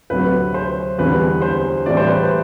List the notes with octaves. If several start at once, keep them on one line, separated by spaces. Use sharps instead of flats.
D2 C3 F#3 B4
C5
E2 D3 G3 B4
C5
A2 E3 G3 D5
C5
B4
C5